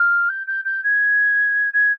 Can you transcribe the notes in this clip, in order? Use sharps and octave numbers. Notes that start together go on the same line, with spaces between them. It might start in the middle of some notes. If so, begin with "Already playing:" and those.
Already playing: F6
G6
G6
G6
G#6
G#6